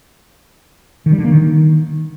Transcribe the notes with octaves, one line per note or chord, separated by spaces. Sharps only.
D#3
G3
D3
A#3
D#3